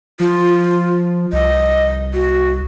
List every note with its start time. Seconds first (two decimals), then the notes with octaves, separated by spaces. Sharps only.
0.20 F3 F4
1.33 C2 D#5
2.14 F#4